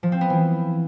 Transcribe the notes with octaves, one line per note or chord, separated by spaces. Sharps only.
F3
C4
B3
E3